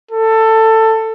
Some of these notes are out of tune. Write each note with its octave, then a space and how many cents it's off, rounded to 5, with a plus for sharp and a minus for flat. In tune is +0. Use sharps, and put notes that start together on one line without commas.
A4 +15